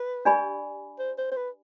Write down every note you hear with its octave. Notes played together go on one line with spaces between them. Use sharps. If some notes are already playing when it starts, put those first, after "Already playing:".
Already playing: B4
D4 G4 D5 G#5 B5
C5
C5
C5
B4